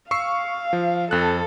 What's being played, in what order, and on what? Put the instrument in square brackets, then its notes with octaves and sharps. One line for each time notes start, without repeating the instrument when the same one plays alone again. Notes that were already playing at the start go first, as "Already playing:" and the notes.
[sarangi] F5 [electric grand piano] C#6 E6 C7
[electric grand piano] F3
[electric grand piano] F2 F#6 [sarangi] A4